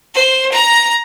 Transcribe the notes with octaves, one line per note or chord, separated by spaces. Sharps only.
C5
A#5